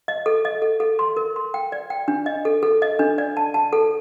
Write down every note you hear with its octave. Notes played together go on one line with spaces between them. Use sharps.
D#5
A4
D#5
A4
A4
C6
A#4
C6
G5
D5
G5
D4
D#5
A4
A4
D#5
D4
D5
A5
A5
A4